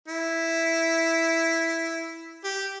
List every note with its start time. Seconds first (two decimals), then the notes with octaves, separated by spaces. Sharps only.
0.08 E4
2.44 G4